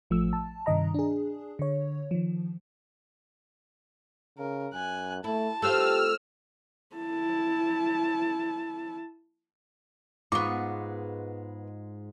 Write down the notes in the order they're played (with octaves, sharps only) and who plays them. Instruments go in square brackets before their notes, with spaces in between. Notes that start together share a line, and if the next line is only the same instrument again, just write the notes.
[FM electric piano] A1 F3 A3 E6
A5
G2 C3 D#3 D#5 A#5
D4 G#4
D3 C#5
D#3 F3
[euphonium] C#3 [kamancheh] A#4
[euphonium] F#2 [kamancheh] G#5 F#6
[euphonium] A3 [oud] E4 [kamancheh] A5
[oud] A3 C4 F4 [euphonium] G4 [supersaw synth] E6 F6
[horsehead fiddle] E4 A5
[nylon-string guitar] G#2 G#3 F4 [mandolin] B3 C#6 [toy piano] D6